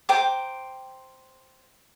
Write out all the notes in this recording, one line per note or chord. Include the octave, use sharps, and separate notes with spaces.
C5 G5 A#5 D6